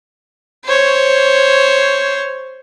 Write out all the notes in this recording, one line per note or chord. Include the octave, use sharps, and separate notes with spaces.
C5 C#5